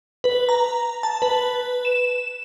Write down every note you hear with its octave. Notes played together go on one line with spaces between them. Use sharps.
B4
A#5
A5
B4
E7